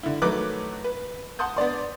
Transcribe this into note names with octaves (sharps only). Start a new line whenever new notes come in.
D3 E4
D#3 F#3 A3 B4 D6 F#6
B4
F#5 A5 C6 D#6 G6
B3 D4 D5 C6